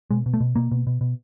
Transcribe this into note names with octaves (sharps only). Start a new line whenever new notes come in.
B2 G#3
B2
A3
B2
B2 A#3
B2
B2
B2